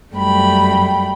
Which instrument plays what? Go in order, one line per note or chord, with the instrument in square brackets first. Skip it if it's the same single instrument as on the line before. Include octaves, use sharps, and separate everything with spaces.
[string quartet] F#2 G3 A3 G5 B5